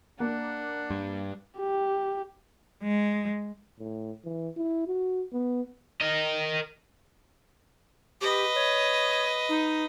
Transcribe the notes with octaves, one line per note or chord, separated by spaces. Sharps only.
A#3 D4 F#5
G2
G4
G#3
A2
E3
E4
F#4
B3
A#4 D#5
G4 B4 D#5
C#5
D#4